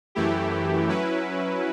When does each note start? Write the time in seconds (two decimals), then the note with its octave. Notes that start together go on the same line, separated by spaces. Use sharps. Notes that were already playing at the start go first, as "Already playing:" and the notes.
0.15 F#2 E3 A3 E4 G4
0.89 F#3 C#4 E4 B4